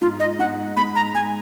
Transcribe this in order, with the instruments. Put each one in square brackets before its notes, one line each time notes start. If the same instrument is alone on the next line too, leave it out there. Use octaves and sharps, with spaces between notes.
[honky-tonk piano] G#2 [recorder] F4
[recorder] D#5
[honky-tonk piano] G#2 [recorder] F#5
[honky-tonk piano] G#3 [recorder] B5
[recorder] A#5
[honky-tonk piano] G#3 [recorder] G#5